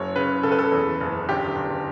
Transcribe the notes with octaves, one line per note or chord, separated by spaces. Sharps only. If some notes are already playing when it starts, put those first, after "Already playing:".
Already playing: F#1 F#3 C#5
C#3 B4
C#3 A4
B4
A4
E2
F#1
G1 G4
G1